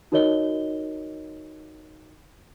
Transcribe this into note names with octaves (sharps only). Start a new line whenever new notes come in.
D#4 F#4 A#4 C#5 D#5 G7